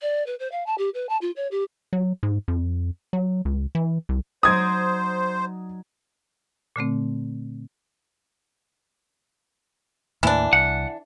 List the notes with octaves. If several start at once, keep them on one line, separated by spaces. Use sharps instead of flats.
D5
B4
C5
F5
A5
G4
B4
A5
F4
C#5
G4
F#3
G#2
F2
F#3
C#2
E3
C2
F#3 D#4 C5 D5 D#6 G#6
A#2 D3 A3 C4
D#2 A2 E3 A#3 D4
C2 F#5